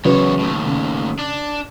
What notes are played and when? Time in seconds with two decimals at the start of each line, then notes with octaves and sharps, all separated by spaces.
0.05 E2 C#3 F#3 B4 C#5
0.39 D#2 A2
0.66 C#3
1.19 D4